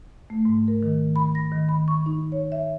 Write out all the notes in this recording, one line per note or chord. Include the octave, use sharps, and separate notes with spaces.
A3
G#2
A#4
D#3
B5
A#6
D#3
B5
C#6
D#4
C#5
E5